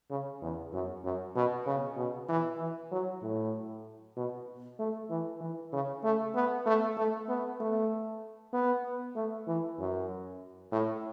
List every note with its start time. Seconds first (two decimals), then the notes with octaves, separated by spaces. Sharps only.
0.10 C#3
0.42 E2
0.73 F#2
1.04 F#2
1.35 B2
1.66 C#3
1.97 B2
2.29 E3
2.60 E3
2.92 F#3
3.22 A2
4.17 B2
4.79 A3
5.10 E3
5.41 E3
5.73 C#3
6.03 A3
6.35 B3
6.66 A3
6.97 A3
7.29 B3
7.60 A3
8.53 B3
9.16 A3
9.47 E3
9.79 F#2
10.72 A2